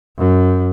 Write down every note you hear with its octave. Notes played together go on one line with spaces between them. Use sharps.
F#2